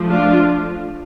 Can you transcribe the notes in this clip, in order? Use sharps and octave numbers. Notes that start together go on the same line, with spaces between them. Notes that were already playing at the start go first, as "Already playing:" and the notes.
Already playing: F3 A3
D4 F4